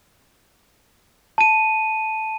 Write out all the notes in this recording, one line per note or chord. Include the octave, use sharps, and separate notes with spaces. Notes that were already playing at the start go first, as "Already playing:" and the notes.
A5 D#7